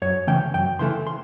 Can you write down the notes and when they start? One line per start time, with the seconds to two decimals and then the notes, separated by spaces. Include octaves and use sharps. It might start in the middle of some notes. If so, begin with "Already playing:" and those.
0.02 F#2 C#5
0.27 C#3 E3 A3 C#4 G5
0.54 F#2 G5
0.79 C#3 E3 A3 C#4 C6
1.07 C6